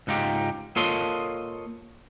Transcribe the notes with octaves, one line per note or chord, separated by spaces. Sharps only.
C#2 G#2 D#4 F4 G4
A#3 F4 A4 C#5 D#5 C6